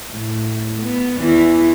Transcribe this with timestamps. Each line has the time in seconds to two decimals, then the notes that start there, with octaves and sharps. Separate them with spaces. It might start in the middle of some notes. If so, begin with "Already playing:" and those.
0.12 A2
0.81 B3
1.17 E2 E3 E4